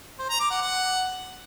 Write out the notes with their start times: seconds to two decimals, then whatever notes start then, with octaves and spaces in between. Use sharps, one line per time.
0.19 C5
0.30 A#5
0.40 D6
0.50 F#5
0.61 F#5